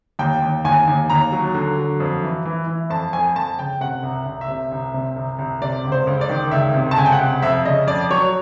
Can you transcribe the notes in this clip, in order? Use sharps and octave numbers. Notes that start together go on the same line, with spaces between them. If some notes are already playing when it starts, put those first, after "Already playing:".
D#2 G5
D#2
D#2 G#5
D#2
D#2 A#5
F#3
D3
F#3
F2
E3
E3
E3
F2 A5
F2 G#5
F2 A5
C#3 G5
C3 F#5
C2
C2
E5
C3
C2
C3
C2
C2
C3 D5
C#2
C5
C#2
D5
D#3
C#2 E5
C3
A5
C#2 G#5
G5
F#5
C3
F2 E5
C#3 D#5
F2 D5
F#3 C#5